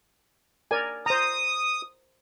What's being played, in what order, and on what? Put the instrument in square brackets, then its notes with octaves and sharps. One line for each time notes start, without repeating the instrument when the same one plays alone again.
[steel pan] A#4 D5 G#5
[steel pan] C5 A#5 [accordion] D#6